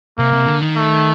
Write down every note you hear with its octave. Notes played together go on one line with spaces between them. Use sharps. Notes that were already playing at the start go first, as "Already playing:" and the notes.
C3 A#3
C3
D3
D#3
A3